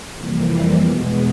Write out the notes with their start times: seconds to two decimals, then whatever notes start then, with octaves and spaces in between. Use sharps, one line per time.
0.16 F2 C3 E3 G3 A#3
0.81 E2 B2 G#3 B3